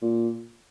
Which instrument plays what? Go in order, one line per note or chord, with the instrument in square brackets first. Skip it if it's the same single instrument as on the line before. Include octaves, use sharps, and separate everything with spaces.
[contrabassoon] A#2